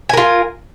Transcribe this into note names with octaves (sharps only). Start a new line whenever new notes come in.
F4 A#4 G#5